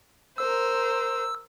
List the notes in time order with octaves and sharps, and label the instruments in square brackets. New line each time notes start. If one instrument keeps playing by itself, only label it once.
[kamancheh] A#4 C5 [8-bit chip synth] E6